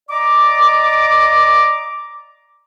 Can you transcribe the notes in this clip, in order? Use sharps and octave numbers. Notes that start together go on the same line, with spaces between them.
D5 D#5 A#5 D6